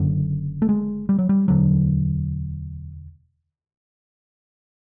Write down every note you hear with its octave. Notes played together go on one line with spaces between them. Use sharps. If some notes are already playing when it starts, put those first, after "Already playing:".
Already playing: F#1 F#2 D3
A3
G#3
G3
F#3
G3
E1 D2 D3 F#3